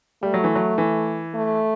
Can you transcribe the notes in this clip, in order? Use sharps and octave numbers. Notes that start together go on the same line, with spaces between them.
G3 A3
F#3
E3
F#3
E3
A3